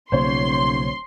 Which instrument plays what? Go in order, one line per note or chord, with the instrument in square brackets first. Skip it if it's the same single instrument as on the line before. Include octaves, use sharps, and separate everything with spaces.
[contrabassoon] D#1 [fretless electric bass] B1 C#3 A#3 [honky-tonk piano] C5 C#5 [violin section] C6